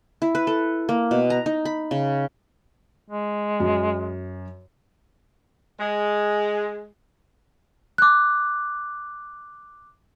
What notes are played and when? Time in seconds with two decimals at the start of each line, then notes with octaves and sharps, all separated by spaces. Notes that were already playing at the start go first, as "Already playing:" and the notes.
0.22 E4
0.35 B4
0.47 A4
0.89 A#3
1.11 B2
1.30 A#5
1.46 D#4
1.65 B5
1.91 C#3
3.10 G#3
3.60 F#2
5.80 G#3
7.98 D6 F#6